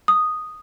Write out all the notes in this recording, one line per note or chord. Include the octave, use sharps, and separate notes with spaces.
D#6